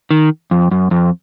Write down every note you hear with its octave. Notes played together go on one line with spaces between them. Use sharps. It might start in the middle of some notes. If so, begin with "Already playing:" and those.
D#3
F2
F#2
F2